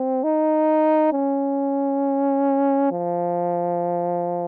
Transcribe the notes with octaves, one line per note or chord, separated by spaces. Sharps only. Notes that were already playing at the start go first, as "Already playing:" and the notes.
Already playing: C4
D#4
C#4
F3